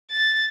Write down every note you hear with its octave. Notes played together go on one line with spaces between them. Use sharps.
A6